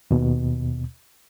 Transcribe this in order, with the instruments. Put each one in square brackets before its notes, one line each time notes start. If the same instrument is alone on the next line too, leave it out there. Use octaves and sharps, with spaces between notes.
[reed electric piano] D#2 B2